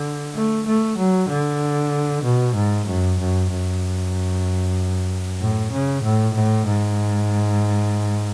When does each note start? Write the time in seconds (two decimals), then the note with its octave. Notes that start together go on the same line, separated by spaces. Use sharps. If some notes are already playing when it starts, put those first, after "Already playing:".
Already playing: D3
0.35 A3
0.66 A3
0.98 F#3
1.29 D3
2.24 B2
2.55 G#2
2.87 F#2
3.19 F#2
3.50 F#2
5.40 A2
5.72 C#3
6.02 A2
6.34 A2
6.66 G#2